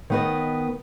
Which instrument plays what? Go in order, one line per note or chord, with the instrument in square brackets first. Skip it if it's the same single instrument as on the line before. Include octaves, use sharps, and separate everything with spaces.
[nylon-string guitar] D#3 B3 D#5